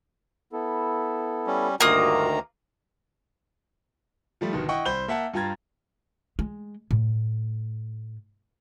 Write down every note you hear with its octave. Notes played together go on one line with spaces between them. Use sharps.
B3 E4 A4
G3 C#4
D2 G2 D#3 A#3 F4 F#4 A#5 D#6
F3 G3 A3
G1 B2 D#3
E4 D#5 F#5 G5 C#6
C2 C5 B5 G6 G7
A#3 E5 F#5 A5
G2 F4 G5 A#5 G#6 A6
G#3
A2